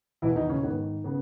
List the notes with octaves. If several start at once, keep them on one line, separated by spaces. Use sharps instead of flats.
E2 B2 E3 E4
D#3 D#4
C#3 C#4
G#2 D#3 B3
C#3 B3